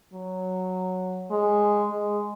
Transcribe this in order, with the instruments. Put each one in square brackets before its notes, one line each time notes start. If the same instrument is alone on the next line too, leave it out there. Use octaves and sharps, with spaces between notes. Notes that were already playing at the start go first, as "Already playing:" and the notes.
[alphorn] F#3
G#3
G#3